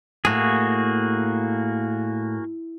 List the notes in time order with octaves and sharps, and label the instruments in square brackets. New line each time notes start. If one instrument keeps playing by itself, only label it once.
[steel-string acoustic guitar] A2 [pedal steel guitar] A#3 F#4 G#4